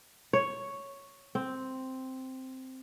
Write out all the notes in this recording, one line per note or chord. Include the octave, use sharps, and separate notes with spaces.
C#5
C4